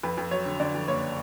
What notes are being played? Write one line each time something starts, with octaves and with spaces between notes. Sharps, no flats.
F2 B4
F2
F#3 C#5
D3
D3 D5
F2
F#1 C#5